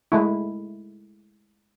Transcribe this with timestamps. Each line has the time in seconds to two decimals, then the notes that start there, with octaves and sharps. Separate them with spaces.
0.12 G#3 A3 E4